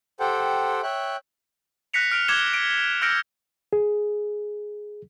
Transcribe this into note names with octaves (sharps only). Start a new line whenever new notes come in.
G4 A4 C5 F#5 G5
C#5 E5 G5 F#6
F#6 A#6 B6 C#7 F7
F6 D7 F7
D6 G#6 C#7 E7 G7
D7
E6 F6 G6 A#6 C#7 D7
G#4